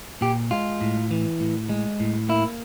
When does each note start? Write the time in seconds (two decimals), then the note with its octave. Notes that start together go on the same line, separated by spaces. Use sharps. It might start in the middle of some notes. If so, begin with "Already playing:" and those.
0.21 A#2 G4
0.51 G#3 F4
0.81 A2
1.11 E3
1.40 A2
1.69 G#3
2.00 A2
2.29 A#3 E4